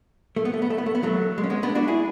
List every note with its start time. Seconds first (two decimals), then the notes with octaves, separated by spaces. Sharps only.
0.36 A3
0.45 B3
0.53 A3
0.62 B3
0.70 A3
0.78 B3
0.86 A3
0.95 B3
1.03 F#3 A3
1.38 G#3
1.43 C#4
1.50 G#3 B3
1.63 B3 D4
1.75 D4 F#4
1.88 E4 G#4